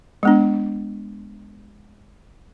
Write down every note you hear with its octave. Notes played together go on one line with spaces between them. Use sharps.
G#3 B3 D4